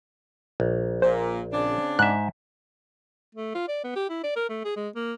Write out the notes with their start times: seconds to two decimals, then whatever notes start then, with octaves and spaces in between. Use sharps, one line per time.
0.60 A#1
1.02 A#2 C5
1.52 C#3 C4 D4
1.99 G#2 E5 F#6
3.35 A3
3.55 F4
3.68 D5
3.84 B3
3.96 G4
4.10 E4
4.24 D5
4.36 A#4
4.49 A3
4.65 G#4
4.76 G#3
4.95 A#3